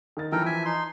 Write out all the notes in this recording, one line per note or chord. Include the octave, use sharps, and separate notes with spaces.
D#3 A#4 A6
E3 F3 A4 A#4 G5
E5 G#5
D#4 C6